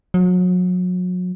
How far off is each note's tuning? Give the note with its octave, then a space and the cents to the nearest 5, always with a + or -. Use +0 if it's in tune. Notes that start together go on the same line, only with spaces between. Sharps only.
F#3 -35